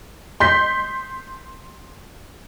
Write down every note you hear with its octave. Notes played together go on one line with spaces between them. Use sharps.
C6 G6 B6